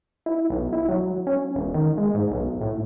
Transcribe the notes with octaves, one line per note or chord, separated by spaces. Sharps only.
E4
B1
E4
F#3
C#4
E1
D#3
G#3
G#2
B1
A2